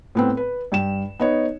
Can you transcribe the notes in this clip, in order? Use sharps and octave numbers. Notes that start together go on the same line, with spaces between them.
A2 B3 C4
B4
G2 G5 E7
B3 D#4 C#5